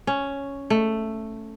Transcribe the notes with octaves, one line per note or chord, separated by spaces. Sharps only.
C#4
A3